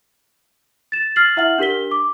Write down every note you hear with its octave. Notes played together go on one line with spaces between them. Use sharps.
A6 E7
F6 A6 C7 F#7
E4 E5 F#5 F6 F#7
D4 G4 A#4 B6 G7
D6